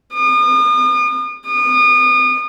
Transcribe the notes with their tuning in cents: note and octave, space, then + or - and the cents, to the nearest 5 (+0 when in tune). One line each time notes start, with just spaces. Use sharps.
D#6 -40
D#6 -35